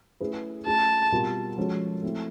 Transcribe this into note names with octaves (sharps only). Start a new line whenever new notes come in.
A3 C#4 E4 G#4 B4
A3 C#4 F4 G#4 A5
B2 G3 C4 F4 A#4
F3 G#3 C#4 F#4 A4
A3 C4 E4